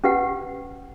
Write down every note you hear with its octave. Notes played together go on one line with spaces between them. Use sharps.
C#4 G4 B4 F#5